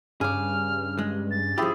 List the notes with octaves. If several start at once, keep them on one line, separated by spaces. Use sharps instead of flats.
G2 C#3 G#4 D6 F6
G#3
A6
F3 E4 G4 G#4